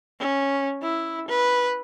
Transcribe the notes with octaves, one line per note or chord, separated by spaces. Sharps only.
C#4
E4
B4